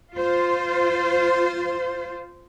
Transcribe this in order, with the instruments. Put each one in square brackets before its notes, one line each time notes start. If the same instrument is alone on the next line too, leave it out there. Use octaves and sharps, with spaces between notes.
[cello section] F4 C5